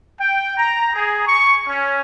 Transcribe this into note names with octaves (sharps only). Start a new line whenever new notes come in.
G5
A#5
G#4
C#6
C#4